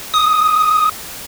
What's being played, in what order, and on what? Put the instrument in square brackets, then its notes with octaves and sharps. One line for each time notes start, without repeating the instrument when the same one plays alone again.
[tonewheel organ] D#6